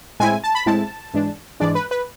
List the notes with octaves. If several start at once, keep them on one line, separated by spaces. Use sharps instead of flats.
A2 G#3 C4 E4 G#5
A5
B5
A2 G#3 C4 E4 A5
G#2 E3 G#3 D4
G#2 E3 G#3 D4 D5
B4
B4